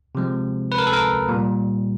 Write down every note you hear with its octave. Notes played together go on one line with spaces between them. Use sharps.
C3 F3 G#3
B4
A#4
A4
A#4
A#2 G3